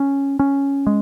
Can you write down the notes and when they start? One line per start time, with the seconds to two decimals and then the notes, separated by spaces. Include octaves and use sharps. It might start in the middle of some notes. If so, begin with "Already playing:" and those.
Already playing: C#4
0.39 C#4
0.87 G#3